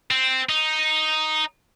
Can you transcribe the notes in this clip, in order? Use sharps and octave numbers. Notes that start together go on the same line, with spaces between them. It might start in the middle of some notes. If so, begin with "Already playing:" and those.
C4
D#4